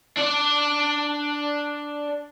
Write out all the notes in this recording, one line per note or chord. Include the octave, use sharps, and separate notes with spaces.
D4 D5